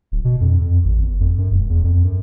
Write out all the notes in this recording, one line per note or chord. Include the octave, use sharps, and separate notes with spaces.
D1
B2
F2
F2
G#1
G1
F2
F#2
E1
E2
F2
F#2